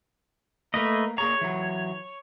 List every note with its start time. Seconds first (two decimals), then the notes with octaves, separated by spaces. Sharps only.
0.74 A3 A#3 A#4 B4 D#5
1.18 A#3 G#4 C#5 A#5
1.41 E3 F#3